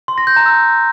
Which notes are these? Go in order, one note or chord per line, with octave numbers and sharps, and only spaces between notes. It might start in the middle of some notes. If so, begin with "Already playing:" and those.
C6
A#6
G6
A#5
E6